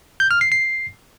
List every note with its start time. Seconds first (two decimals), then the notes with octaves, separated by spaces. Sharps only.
0.20 G6
0.31 F6
0.41 C7
0.52 C7